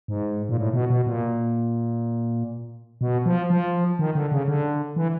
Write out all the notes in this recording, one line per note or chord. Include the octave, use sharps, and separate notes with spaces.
G#2
A#2
A2
B2
B2
A#2
B2
F3
F3
D#3
D3
C#3
D3
E3